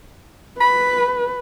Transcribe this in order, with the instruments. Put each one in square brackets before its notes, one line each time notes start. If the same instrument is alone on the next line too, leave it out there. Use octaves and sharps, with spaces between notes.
[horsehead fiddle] B4 [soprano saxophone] B5